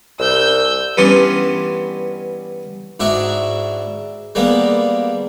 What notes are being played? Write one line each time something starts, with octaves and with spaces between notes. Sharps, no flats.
C2 E6 G6
G2 E3 B3 C#4 D4 C6
G#2 D4 E4 F#4 C#6
G3 G#3 A#3 B3